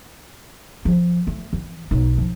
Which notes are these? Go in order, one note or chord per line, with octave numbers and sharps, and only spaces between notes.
F3
A3
E3
B1 D#4
F3